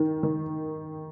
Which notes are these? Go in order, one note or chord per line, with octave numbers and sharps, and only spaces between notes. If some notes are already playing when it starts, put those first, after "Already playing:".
Already playing: D#3
D#3